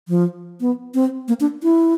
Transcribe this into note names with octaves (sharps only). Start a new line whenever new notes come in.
F3
B3
C4
A#3
D4
E4